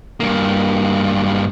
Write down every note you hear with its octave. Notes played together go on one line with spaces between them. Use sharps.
G2 A#3